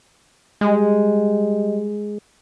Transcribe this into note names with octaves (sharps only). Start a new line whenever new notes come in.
G3 G#3 G4 D#5